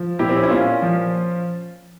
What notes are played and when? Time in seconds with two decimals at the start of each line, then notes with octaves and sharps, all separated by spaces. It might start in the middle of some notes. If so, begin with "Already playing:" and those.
Already playing: F3
0.19 A#2 E4 G4
0.29 C4
0.36 C#4
0.43 E4
0.50 A#2 C#4 F4
0.82 F3